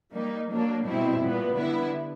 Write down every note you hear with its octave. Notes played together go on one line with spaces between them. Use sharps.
G3 A#3 D#4
F#3 A#3 D4
B2 G3 C4 E4
A#2 G3 B3
D3 G3 B3 E4